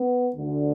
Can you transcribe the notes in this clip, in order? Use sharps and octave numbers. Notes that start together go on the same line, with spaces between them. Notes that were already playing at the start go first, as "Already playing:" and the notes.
Already playing: B3
D2 D3